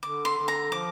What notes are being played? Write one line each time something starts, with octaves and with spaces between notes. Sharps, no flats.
D3 D6
C6
D3
A#5
F3 D6